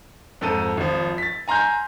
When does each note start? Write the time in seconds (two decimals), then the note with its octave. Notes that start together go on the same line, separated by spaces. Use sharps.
0.41 F2 G#2 A4 A5 D#7
0.77 G#1 F3
1.18 A6 B6
1.48 G#5 A#5 C6 F6 G6